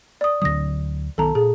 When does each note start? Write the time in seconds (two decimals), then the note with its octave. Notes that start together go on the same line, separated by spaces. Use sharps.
0.21 D5 D#6
0.42 D2 D3 F#3 D#6 A#6
1.18 B1 D#3 B3 A4 A5 A#5
1.35 A#2 G#4